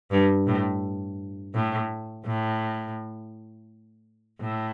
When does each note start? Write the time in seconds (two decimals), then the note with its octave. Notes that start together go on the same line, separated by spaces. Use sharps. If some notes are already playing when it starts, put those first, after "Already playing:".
0.11 G2
0.47 A2
1.55 A2
2.25 A2
4.40 A2